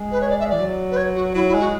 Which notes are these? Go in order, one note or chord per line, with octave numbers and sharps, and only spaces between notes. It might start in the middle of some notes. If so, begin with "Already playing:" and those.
Already playing: G#3
B4
C#5
D5
E5
E3 D5
F#3
B4
C#5
F#4
F#3 E4
E4
G#3
F#4